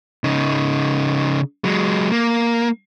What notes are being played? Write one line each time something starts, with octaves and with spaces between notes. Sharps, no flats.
C#3 D#4
F#3 G#3
A#3